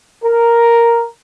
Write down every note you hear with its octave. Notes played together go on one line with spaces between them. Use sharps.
A#4